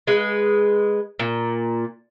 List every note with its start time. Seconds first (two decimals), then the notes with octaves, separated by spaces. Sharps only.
0.07 G#3 B4
1.19 A#2